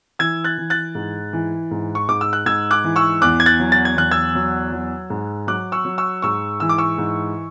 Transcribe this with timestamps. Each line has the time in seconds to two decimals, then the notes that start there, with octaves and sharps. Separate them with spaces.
0.19 E3 E6 G#6
0.44 F#6 A6
0.58 E3
0.70 F#6 A6
0.95 G#2
1.33 E3
1.71 G#2
1.95 C#6
2.09 G#2 D6
2.21 E6
2.33 F#6
2.46 G#2 E6 G#6
2.71 D6 F#6
2.84 E3
2.96 C#6 E6
3.22 E2 D6 F#6
3.40 G#6
3.46 F#6 A6
3.60 F#3
3.72 A6
3.85 G#6
3.96 E2 F#6
4.11 E6 G#6
4.35 F#3
4.72 F#3
5.10 G#2
5.47 F#3 D6 F#6
5.72 C#6 E6
5.85 F#3
5.98 C#6 E6
6.22 G#2 C#6 E6
6.60 E3 E6
6.69 D6
6.78 C#6 E6
6.98 G#2